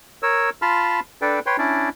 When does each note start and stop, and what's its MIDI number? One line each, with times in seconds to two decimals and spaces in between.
0.23 0.50 70
0.23 0.50 73
0.23 0.50 88
0.62 1.00 65
0.62 1.00 81
0.62 1.00 83
0.62 1.00 84
0.62 1.00 89
1.22 1.40 62
1.22 1.40 69
1.22 1.40 71
1.22 1.40 74
1.22 1.40 79
1.46 1.57 71
1.46 1.57 73
1.46 1.57 79
1.46 1.57 84
1.58 1.89 61
1.58 1.89 62
1.58 1.89 64
1.58 1.89 74